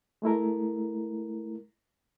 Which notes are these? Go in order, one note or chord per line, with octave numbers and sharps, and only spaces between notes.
G#3 A3 E4 A#4